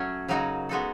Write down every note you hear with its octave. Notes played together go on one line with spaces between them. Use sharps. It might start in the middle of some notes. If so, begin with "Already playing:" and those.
Already playing: F#3 A3 C#4
C#3 F#3 A#3 D#4 F#4
G#3 B3 D#4 F#4 A4